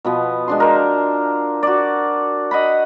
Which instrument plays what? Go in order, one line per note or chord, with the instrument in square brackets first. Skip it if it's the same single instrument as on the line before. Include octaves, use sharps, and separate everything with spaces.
[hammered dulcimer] B2 F3 B3
G#3 D4 C6
A#4 C5
F#4 D5
D#5 F#5 B5